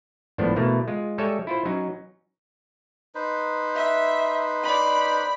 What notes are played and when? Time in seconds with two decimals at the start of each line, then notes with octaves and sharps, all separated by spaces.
0.38 G#1 A2 F3 B3 D4 C5
0.56 B2 E3 A3 A#3
0.88 G#3 F4
1.18 G3 G#3 A4 C#5 E5 G#5
1.47 E4 F4 C5
1.65 F#3 C#4 D#4
3.15 D#4 B4 C5
3.75 E5
4.63 D5 B5